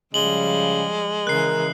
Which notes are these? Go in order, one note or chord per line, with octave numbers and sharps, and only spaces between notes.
C#3 F3 G3 G#3 F#7 G7
C#3 E3 A#4 F#6 C7